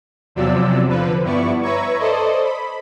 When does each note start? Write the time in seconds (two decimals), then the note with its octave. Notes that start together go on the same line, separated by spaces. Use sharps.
0.35 E2 C3 F3 F#3 D5 E6
0.89 D3 F3 B4
1.23 G2 B3 E4 D5 C#6
1.62 B4 C#5 E5 A#5 C#6 G#6
1.99 A4 C5 D5 D#5
2.44 B5